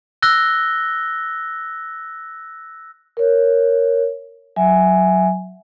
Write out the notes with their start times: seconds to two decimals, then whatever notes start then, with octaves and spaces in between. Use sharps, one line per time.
0.22 E6 F#6 A#6 G7
3.17 A#4 C#5
4.56 F#3 E5 G#5